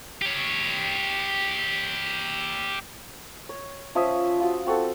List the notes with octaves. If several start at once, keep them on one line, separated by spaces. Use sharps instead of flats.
G4 C#5
C#5
F3 C#4 E5 D#6
F4 F#4
C4 F#4 A4